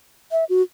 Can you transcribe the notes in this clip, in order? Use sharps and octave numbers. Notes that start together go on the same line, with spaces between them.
E5
F#4